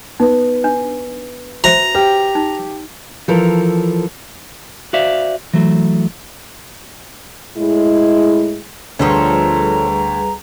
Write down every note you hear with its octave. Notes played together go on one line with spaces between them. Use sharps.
B3 D#4
D4
F#4 C5 E5 A#5
G4 B4
D#4
E3 F3 A4 A#4
F#4 C5 D5 E5 F5
E3 F#3 A3
A2 G#3 E4
D2 F3 G3 G#4 A4 B4 C#5 A#5